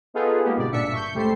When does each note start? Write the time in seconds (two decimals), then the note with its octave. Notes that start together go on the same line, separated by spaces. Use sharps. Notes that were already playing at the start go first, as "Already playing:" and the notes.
0.14 B3 D#4 F4 G#4 A4 B4
0.43 G#3 A#3 B3 G4
0.57 G1 B2 D5
0.72 G1 A#2 D4 E5 B6 C#7
0.93 C#6 G6
1.14 C#2 G3 A3 A4 C5 C7